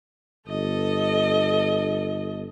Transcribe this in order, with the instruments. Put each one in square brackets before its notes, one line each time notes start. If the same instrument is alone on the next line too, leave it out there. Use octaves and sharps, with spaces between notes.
[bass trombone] G1 [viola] A4 D#5